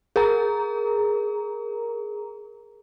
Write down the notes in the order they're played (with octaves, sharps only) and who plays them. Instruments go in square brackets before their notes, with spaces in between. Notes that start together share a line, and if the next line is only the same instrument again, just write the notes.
[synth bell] G#4 A#4 A#5